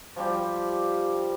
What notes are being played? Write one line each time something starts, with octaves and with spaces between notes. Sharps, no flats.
F3 G3 G4